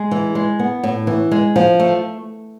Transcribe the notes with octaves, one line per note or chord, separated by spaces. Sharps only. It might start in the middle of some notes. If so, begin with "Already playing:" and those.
Already playing: G#3
E3
G#3
B3
A2
E3
G#3
F3
A3